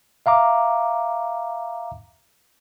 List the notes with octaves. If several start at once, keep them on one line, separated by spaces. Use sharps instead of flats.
E5 F5 A#5 D6